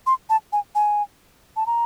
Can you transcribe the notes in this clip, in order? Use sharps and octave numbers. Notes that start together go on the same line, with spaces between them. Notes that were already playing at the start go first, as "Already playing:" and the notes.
C6
A5
G#5
G#5
A5
A#5